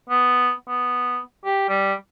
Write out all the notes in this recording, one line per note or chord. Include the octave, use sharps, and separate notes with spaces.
B3
B3
G4
G3